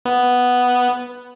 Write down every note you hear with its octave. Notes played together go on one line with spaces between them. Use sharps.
B3